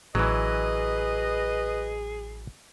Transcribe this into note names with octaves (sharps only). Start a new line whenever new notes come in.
A1 E3 F#3 G#4 B4 D#5